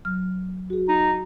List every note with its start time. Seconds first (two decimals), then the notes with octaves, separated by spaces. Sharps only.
0.05 F#3 F6
0.70 F#4 G#4
0.88 D#4